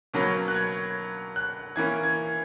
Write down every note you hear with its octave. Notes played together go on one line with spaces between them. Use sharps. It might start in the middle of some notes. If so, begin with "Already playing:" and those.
B2 F#3 A#3 C#4
F#6
G#6
F#6
E3 A#3 C#4 G#6
G#6